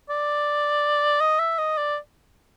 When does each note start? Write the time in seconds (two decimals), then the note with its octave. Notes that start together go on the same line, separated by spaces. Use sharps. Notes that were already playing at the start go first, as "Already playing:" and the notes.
0.10 D5
1.21 D#5
1.39 E5
1.58 D#5
1.77 D5